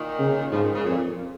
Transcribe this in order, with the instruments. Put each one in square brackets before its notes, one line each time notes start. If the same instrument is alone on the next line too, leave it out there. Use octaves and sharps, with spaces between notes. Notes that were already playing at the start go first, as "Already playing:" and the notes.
Already playing: [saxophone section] A#2 D#3
[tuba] C#3
[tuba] G#2 [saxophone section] C#3 F3
[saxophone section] A#2 D#3
C#3
[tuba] F2 [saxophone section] A#2